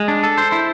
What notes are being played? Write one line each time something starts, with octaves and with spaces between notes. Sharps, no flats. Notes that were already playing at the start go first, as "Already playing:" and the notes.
Already playing: G#3
D4
A4
C5
E4